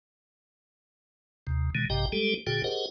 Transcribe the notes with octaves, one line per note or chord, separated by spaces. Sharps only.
D#2 C3
B2 D3 D#3 G#3
A#1 G2 C3 G4 D#5 G5
G3 G#3 G4 A4
A#2 D3 F#4 G#4 G5
G4 G#4 A#4 C5 D#5 F#5